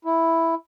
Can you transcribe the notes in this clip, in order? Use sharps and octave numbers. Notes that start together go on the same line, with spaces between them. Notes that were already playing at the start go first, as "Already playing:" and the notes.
E4